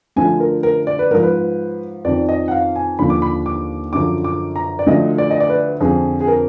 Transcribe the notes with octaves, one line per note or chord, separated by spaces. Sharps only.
D2 D3 F3 G#5
A#4
A#4
D5
B4
G#2 F3 A#4
B4
F2 D#3 D5
D#5
F#5
F5
G#5
D#2 D3 F3 B5
D6
B5
D6
F#2 D3 F3 D6
D6
A#5
D5
D2 D3 F3 D#5
D5
D#5
D5
B4
F2 D3 F3 G#4
G#4
A#4